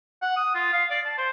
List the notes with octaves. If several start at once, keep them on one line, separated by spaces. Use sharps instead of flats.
F#5
D#6
F4
F5
D5
A5
C5